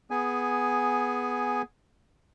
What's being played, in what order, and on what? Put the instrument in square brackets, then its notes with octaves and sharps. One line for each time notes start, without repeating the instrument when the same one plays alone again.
[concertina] B3 G#4 G#5